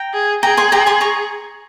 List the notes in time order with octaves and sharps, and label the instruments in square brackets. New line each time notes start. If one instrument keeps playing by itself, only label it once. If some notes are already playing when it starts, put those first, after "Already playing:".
Already playing: [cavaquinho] G5 A#5
[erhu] G#4
[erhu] G#4 [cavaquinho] G5 A#5
[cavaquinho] G#5 C6
G5 A#5
G#5 C6
A#5 C#6